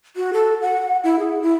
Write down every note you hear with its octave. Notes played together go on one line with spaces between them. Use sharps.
F#4
A4
F#5
E4
G#4
E4